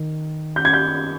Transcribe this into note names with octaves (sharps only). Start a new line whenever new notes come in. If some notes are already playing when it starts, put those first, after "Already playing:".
Already playing: D#3
G6
G#6
G6